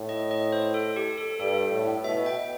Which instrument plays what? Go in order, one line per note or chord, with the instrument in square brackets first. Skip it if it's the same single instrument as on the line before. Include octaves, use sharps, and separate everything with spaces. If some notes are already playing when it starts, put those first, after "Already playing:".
Already playing: [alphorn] A2
[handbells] D#5
D#5
C5
A4
G4
A4
[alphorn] G2 [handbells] A4
[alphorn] A2
[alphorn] B2 [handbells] E5
[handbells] G5